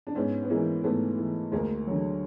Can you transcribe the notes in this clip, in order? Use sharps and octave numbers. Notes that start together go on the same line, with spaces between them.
D4
G#2 B3 C#4
B3
E3 G#3 A#3
G#2 A3 B3
E3
D2 G#3 A#3
D3 F#3